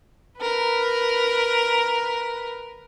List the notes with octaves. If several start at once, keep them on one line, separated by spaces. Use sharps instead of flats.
A#4 B4